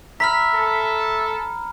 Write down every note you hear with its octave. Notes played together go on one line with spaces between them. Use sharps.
E5 A#5 B5 F6 B6
A4